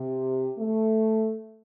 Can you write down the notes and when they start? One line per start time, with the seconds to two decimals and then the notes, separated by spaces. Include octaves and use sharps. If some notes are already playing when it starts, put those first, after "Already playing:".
Already playing: C3
0.58 A3